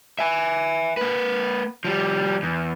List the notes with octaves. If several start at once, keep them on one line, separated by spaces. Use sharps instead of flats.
E5 G#5
A#3 B4
F3 G3
E2